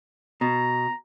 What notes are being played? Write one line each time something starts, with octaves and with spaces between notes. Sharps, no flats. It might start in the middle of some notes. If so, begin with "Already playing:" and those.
B2 A#5